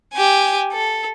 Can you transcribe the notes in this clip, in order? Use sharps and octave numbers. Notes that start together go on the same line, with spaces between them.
G4 G#5
A4